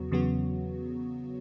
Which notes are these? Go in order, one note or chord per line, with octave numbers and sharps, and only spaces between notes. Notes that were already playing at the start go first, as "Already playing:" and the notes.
Already playing: E2 C#3 F#3 B3 F#4
E2 C#3 F#3 B3 F#4